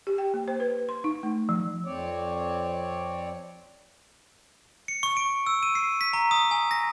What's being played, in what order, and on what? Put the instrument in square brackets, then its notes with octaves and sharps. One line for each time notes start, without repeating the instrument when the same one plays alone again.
[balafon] G4
G5
A#3
C5
B4
C6
D#4
A3
F3
[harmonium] F2 C4 C#5 D5
[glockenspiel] C#7
C#6
D7
E6
D#7
C7
B6
A#5
D#6
G#5
A#6